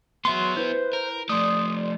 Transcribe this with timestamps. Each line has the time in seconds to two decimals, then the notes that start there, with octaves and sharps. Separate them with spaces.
0.25 F#3 B3 E5 C6
0.57 E4 B4 C5
0.93 A#4
1.29 F3 A3 D5 C6 D#6